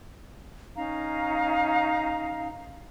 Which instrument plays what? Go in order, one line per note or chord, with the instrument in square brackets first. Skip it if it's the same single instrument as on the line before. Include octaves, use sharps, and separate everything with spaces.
[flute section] C#4 D#4 F5 A#5